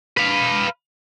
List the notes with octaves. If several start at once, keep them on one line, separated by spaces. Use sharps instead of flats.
B4 F5